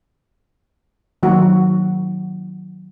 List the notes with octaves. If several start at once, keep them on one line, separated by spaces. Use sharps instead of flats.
D#3 F#3 A#3 F#4